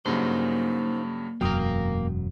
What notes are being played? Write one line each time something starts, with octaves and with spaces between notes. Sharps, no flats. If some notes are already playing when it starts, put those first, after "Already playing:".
G2 C#3 F#3 A#3 D#4 C5
E1 F#2 F#3 A#3 A#4 G5 D#6